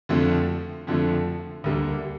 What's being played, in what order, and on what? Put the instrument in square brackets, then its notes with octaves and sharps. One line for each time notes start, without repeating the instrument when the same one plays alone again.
[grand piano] F2 D3 F3 A3
F2 D3 F3 A3
D2 D3 G3 A#3